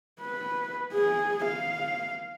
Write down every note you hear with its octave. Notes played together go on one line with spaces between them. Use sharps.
B4
G#4
F5